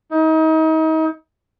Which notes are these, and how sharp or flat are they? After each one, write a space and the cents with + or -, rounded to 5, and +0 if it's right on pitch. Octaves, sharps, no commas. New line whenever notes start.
D#4 +35